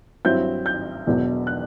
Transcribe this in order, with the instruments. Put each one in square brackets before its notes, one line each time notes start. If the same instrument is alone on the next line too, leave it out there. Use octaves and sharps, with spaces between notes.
[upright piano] G2 F#3 C4 E4 G6
G6
E1 E2 B2 F#3
F#6